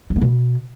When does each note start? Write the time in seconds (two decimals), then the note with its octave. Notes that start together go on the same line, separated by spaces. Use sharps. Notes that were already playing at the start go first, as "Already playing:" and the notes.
0.10 A3
0.16 B3
0.21 B2